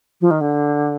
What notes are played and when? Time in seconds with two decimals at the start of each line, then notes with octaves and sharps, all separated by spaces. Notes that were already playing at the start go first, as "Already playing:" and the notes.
0.21 F3
0.31 D#3
0.41 D3